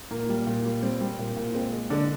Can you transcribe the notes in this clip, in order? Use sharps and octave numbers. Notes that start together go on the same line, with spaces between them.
A#2 A#3
G3
A#2
G3
G3 C4
G3
A#2
A#2
G#3 C4
G#3
D3 G#3 D4